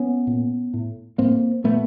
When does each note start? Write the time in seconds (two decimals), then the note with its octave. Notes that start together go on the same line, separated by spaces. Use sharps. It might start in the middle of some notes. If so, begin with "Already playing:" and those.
Already playing: B3 C#4
0.27 A#2
0.74 A2
1.18 A2 A#3 C4
1.64 A#2 A3 B3